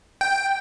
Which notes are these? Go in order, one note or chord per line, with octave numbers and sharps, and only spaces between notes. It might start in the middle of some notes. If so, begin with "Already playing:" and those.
G5